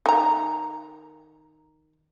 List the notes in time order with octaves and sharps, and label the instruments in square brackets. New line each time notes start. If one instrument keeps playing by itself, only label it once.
[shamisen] D#3 A#5